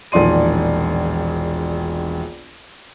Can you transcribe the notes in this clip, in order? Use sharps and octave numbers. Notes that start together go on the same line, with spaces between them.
E1 A#1 D#3 D5 C6 D#7